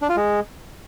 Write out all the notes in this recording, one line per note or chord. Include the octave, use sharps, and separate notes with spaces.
D4
F4
G#3